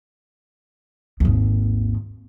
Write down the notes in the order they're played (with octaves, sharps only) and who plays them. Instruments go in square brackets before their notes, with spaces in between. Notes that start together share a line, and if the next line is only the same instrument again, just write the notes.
[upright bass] G#1 D#2